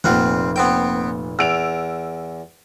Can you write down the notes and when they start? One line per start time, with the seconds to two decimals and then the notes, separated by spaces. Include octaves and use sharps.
0.04 F1 A#2 C4 F4 F#5
0.56 B3 C4 G5
1.39 E2 E6 D7 F7